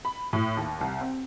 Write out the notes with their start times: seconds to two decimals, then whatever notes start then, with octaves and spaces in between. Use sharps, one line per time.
0.05 B5
0.33 A2
0.57 D#2
0.81 C2
1.01 C4